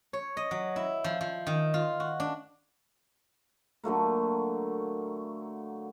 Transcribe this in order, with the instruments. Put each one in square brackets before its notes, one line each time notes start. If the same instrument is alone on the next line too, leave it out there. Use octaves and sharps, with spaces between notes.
[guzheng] C#5
D#5
F#3
E4
F3
F3
D#3
F4
F#4
D4
[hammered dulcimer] D3 F#3 A3 A#3